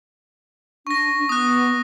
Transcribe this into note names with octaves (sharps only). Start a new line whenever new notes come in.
D4 C#6 A#6
B3 D#6 F#6